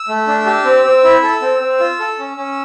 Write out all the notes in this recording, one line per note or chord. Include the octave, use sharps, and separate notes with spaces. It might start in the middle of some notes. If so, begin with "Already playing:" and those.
Already playing: E6
A3
D4
G4
C4
C4
E4
A4
C4
C4
F4
A4
C#4
C#4